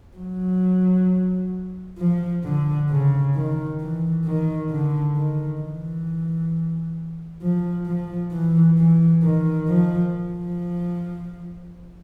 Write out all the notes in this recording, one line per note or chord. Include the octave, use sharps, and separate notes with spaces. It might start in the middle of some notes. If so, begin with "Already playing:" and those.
F#3
F3
D3
C#3
D#3
E3
D#3
D3
D#3
E3
F3
F3
E3
E3
D#3
F3
F3